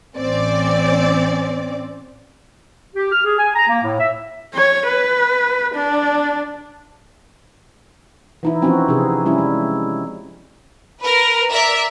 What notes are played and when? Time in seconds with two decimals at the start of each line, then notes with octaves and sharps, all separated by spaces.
0.16 A1 C4 C#4 D5
2.95 G4
3.11 F6
3.24 G#4
3.38 G#5
3.55 A#5
3.68 A#3
3.82 A2
3.99 E5
4.54 C#5
4.87 B4
5.75 D4
8.43 E3 D#4 E4
8.62 F3 C4 C#4 D#4 F#4
8.88 C3 D#4 G#4
9.25 G3 C#4 E4
9.38 G#3
11.00 A#4 B4
11.51 A#4 D5 E5